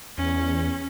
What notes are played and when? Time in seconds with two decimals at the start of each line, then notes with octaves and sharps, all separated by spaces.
0.18 E2 C#4